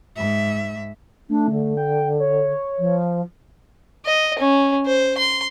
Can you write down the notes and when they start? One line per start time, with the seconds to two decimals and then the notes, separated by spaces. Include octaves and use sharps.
0.16 G#2 E5
1.29 A3 D4
1.50 D3
1.77 G5
2.19 C#5
2.78 F3
4.06 D#5
4.39 C#4
4.86 C5
5.18 C6